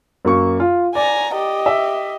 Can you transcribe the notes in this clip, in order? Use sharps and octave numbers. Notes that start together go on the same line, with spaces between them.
F#2 A#3 C#6
F4
D5 G#5 A#5
G4 D#5
E5